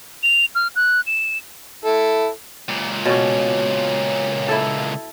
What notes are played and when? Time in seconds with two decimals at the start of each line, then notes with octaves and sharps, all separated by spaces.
0.23 F7
0.55 F6
0.76 F#6
1.07 E7
1.85 E4 A4
2.69 C#2 A#2
3.05 B2 C#4 C#5
4.49 E4 A4